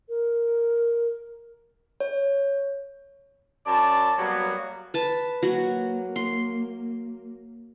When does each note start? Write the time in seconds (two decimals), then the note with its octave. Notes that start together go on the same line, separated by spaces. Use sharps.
0.09 A#4
2.00 C#5
3.66 F#2 D5 A5
4.18 F#3 G3 A#3 B3 F#4
4.94 B4 A5
5.43 F#3 A#3 F#4
6.16 C6